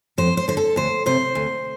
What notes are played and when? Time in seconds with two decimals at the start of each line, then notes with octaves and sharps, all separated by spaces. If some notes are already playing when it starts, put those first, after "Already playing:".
0.18 F2 C5
0.37 C5
0.48 D3 C5
0.57 A4
0.76 D2 C5
1.06 C3 C5
1.35 D2